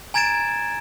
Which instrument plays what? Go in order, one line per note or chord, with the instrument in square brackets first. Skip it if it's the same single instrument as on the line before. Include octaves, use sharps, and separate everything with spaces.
[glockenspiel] G#5 A#5 G#6 A6 D7 E7